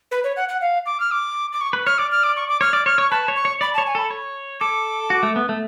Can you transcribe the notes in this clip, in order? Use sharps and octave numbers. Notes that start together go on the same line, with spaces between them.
B4
C#5
F#5
F#5
F5
D6
F6
D6
D6
C#6
B4
C#5 F6
D5 D6
F6
D6
C#6
D6
C#5 F6
D5 D6
C#5 F6
C#5 C#6
B4 A5
C#5
C#6
C#5
D5 B5
A5
C#5
G#5
A4 B5
C#5
A4 D6
F#4
A3
B3
A3